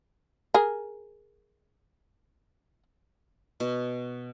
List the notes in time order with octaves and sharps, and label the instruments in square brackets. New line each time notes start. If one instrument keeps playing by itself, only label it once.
[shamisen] G#4 A#4
[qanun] B2